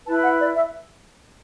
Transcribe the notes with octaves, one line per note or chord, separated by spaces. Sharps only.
E4 B4 A5
F#5
D5
E5